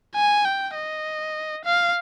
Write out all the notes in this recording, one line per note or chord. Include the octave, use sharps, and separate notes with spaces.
G#5
G5
D#5
F5